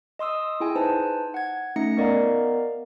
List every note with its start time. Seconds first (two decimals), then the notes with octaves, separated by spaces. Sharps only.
0.19 D#5 C6 D#6 E6
0.60 E4 G#4 G5 G#5
0.76 D#4 B4 C5 G#5 A5
1.34 F#5 G#6
1.76 A3 C#4 D#4 A#6 C#7
1.97 B3 A#4 D5 D#5 F5 A#5